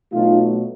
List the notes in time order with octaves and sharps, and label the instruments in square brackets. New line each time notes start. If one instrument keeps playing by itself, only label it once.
[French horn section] B2 F#3 A3 D#4 F4